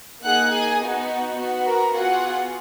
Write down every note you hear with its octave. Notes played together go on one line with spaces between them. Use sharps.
A#3 D#4 G#4 F#5 F#6
G#4 G#5
B3 D#4 F#4
B3 F#4
A#4 A#5
B3 F4 F#4 G#4 F#5